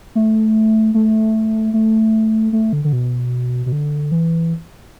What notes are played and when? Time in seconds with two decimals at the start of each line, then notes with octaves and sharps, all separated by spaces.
0.15 A3
0.94 A3
1.74 A3
2.53 A3
2.73 D3
2.84 D3
2.93 B2
3.66 B2
3.72 D3
4.12 E3